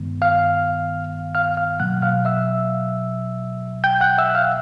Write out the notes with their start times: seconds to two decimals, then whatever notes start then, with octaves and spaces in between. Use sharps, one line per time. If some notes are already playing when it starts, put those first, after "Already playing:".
Already playing: G2 D#3 G#3 B3
0.22 F5 F6
1.35 F5 F6
1.57 F5 F6
1.80 B2 F#3 A#3 F#5 F#6
2.02 F5 F6
2.25 E5 E6
3.84 G5 G6
4.01 F#5 F#6
4.18 E5 E6
4.30 F#6
4.35 F5 F6